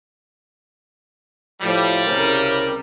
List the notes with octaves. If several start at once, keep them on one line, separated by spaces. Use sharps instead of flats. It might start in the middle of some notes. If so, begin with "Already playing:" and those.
A2 F3 G3
C2 C#3 A#4